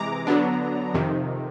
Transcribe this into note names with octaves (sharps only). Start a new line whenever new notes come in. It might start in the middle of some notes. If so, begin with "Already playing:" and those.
Already playing: C3 E3 G#3 A#5 D6
D3 F#3 B3 D4
F2 C3 D#3